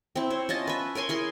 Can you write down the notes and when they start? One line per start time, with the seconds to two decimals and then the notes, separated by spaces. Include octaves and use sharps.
0.16 C4 E4
0.30 C5 C#5
0.49 C#4 F4 D#5 A5
0.67 B4 E5
0.95 A#4 C#5 G#5 C6
1.09 E4 G#4 A#4 C6